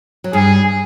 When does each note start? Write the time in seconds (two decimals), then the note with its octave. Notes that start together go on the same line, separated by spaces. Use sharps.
0.24 F#3
0.33 G2 G3 G#4